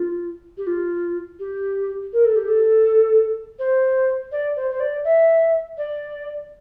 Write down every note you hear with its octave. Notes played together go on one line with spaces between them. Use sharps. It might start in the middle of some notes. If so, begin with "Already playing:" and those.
Already playing: F4
G4
F4
G4
A#4
A4
G4
A4
C5
D5
C5
C5
D5
E5
D5